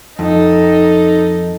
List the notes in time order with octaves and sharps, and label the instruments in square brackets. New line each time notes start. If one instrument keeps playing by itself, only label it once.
[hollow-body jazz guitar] F2 [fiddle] D#4 A4